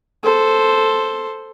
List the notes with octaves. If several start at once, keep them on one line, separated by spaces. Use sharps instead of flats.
A4 C5